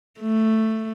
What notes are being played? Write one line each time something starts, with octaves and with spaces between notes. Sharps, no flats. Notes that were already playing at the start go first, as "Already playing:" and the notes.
A3